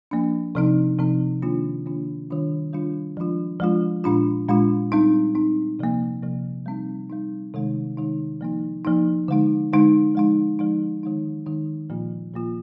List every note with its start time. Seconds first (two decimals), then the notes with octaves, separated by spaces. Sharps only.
0.11 F3 A#3 D4
0.55 C3 F3 C4 D#4
0.99 C3 F3 C4 D#4
1.42 D#3 A#3 D4 F4
1.86 D#3 A#3 D4 F4
2.30 D#3 G3 D4 F4
2.73 D#3 G3 D4 F4
3.17 F3 G#3 D4 F4
3.60 F3 G#3 D4 F4
4.04 A#2 G#3 D4 F4
4.49 A#2 G#3 D4 F4
4.92 G3 C4 D#4
5.35 G3 C4 D#4
5.79 C3 F3 A#3
6.22 C3 F3 A#3
6.66 G3 C4 D#4
7.10 G3 C4 D#4
7.54 C3 D#3 G#3 D#4
7.97 C3 D#3 G#3 D#4
8.41 F3 A#3 D#4
8.85 F3 A#3 D#4
9.28 D3 G#3 D#4
9.72 D3 G#3 D#4
10.15 F3 G#3 D#4
10.59 F3 G#3 D#4
11.03 D#3 G#3 D#4
11.46 D#3 G#3 D#4
11.90 A#2 F3 A#3 F4
12.34 A#2 F3 A#3 F4